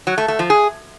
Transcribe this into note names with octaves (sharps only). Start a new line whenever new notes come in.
F#3
A3
A3
F3
G#4